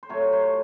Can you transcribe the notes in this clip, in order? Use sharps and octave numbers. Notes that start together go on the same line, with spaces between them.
C5
C3 F#3 A3 C#5
C5